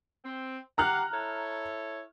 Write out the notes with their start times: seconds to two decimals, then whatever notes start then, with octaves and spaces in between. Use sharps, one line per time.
0.24 C4
0.78 G4 F5 F#5 A#5 F6 F#6
1.14 E4 A4 C#5